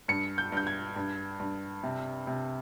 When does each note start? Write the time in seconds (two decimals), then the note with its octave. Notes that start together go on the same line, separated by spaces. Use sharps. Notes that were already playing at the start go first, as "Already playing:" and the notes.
0.08 G2 C#7
0.38 G6
0.52 G2 G6
0.67 G#6
0.96 G2
1.40 G2
1.83 C3
2.27 C3